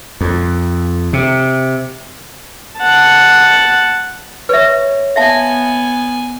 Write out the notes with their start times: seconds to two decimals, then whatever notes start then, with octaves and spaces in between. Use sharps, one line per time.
0.21 F2
1.13 C3
2.78 F#5 A5
4.49 B4 C#5 E5
5.16 B3 E5 F5 G#5 A5